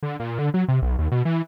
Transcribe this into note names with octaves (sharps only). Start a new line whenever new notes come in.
D3
A#2
D3
F#3
C3
B1
D#2
B2
E3